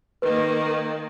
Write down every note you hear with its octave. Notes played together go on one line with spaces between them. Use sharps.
D#3 A#3 B4